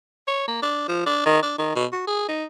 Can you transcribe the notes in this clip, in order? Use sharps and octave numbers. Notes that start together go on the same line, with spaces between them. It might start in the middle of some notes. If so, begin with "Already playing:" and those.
C#5
A#3
D4
F3
D4
D#3
D4
D#3
B2
F#4
G#4
D#4